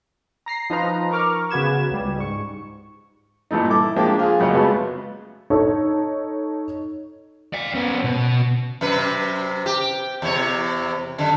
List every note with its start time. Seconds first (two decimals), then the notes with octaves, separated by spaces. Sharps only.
0.46 A#5 A#6 C7
0.70 F3 D#4 F4 B4 A#5
1.11 A#4 A#5 C#6 D6 F6
1.51 C#3 B3 F#4 B4 G#6 E7
1.91 C#2 G3
2.16 G#2 C#6
3.51 G2 A#2 E3 A3 D#4
3.70 E4 A4 D6
3.96 F3 G#3 A#3 D4 G4
4.19 F4 G#4
4.40 F#2 C#3 A#3 C#5 D#5
4.53 G#3 A3 B3 F4 F#4 B4
5.50 D#4 A4 C#5
7.53 D5 F5
7.75 B3 C#4
8.04 B2
8.81 F#2 C3 B4
9.66 G4
10.22 E2 C3 C#5
11.18 F#2 D3